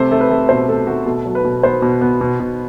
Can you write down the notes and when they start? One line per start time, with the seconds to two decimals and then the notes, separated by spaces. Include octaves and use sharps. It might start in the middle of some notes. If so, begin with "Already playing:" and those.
Already playing: C3 A3 C5
0.11 A3
0.20 B4
0.30 A3
0.49 B2 C5
0.68 A3 A4
0.87 A3 F#4
1.06 B2 A4
1.26 F#3
1.35 B4
1.45 B2
1.63 B3 C5
1.82 B2
2.01 B3
2.21 B2
2.40 B2